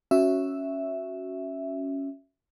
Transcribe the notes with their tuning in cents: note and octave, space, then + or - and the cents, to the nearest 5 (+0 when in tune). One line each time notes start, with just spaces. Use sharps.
C#4 +0 F#4 +0 E5 +0